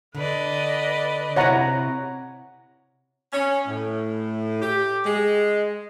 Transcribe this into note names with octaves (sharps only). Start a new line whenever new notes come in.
D3 B4 D5 D#5
C3 C4 E4 C#5 F#5 A#5
C#4
A2
G4
G#3